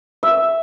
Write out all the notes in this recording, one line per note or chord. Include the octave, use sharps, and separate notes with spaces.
E5